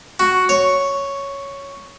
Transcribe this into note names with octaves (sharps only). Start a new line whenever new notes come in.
F#4
C#5